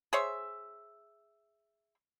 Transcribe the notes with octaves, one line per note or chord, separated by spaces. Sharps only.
G#4 C5 C#5 E5